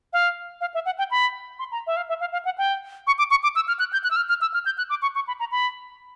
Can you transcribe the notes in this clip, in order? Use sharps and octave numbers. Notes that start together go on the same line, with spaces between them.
F5
F5
E5
F#5
G5
B5
C6
A#5
E5
F5
E5
F5
F5
F#5
G5
C#6
D6
C#6
D6
E6
F6
F#6
G6
F#6
E6
F6
F6
E6
F6
G6
F#6
D6
C#6
C#6
B5
A#5
B5